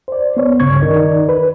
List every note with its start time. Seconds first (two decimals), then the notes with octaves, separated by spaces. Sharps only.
0.08 C5 D5
0.37 B3 C5 C#5
0.60 C#2 G2 C#3 C#6 G#6
0.81 D#3 D#4 A#4 D5
1.29 B4